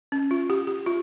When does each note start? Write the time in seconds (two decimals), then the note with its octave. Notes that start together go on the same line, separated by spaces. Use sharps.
0.12 C#4
0.31 F4
0.50 G4
0.67 G4
0.86 F4